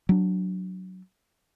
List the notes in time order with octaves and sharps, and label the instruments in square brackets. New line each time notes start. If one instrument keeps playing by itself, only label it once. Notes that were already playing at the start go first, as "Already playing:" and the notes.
[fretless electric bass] F#3 D4